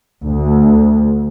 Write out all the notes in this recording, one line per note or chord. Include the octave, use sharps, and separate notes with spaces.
D2